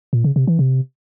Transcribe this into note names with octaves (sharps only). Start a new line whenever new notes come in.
A#2
C#3
C3
E3
C3